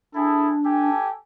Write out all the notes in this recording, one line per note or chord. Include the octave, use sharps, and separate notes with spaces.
D4 E4 G#4 A4
G4 A4 G#5